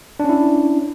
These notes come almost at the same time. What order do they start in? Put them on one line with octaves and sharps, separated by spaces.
D4 C#4 E4